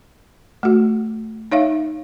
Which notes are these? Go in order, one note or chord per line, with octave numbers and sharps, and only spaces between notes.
A3 F#4
D#4 C#5 E5 F5